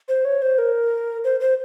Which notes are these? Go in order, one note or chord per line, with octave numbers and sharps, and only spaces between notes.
C5
C#5
C5
A#4
C5
C5